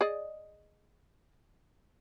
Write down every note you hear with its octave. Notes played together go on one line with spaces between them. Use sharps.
G#4 D5 D#5